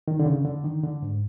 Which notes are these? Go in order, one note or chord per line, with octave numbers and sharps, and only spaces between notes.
D#3
D3
C#3
D3
D#3
D3
G#2